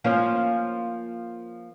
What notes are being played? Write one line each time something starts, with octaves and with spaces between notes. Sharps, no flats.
F3 A#3 C#4